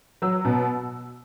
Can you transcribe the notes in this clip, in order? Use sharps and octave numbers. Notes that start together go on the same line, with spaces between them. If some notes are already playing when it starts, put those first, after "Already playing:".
F#3 E6
B2